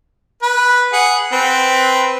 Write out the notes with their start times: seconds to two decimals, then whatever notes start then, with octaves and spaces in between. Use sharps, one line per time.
0.43 B4 B5
0.93 G#4 F#5
1.32 C4 B4